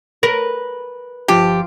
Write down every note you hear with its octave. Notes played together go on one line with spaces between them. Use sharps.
A#4 B4
G1 F3 F4 G4 A5